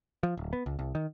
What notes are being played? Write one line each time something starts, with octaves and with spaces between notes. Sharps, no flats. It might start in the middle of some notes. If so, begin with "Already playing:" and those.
F3
D1
B3
C#2
C2
D#3